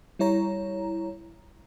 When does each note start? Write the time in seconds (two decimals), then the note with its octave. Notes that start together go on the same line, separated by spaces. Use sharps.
0.19 G3 E4 C#5 A#5